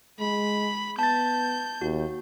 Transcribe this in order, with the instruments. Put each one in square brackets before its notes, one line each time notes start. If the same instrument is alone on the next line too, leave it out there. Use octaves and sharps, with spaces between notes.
[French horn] G#3 [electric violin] B5
[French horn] B3 [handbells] A5 A6 [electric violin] G6
[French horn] D#2 [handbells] F#4